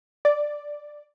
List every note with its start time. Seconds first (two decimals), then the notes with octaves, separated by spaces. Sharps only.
0.25 D5